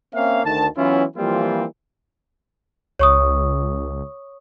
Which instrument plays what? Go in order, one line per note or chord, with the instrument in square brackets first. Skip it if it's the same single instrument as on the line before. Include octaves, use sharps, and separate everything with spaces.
[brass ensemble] A#3 C4 C#4 E5 F5
D2 D#3 A5
E3 F#3 B3 C#4 E4 F4
E3 F3 G3 A#3 C4 F4
[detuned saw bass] C#2 [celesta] C#5 C#6 D#6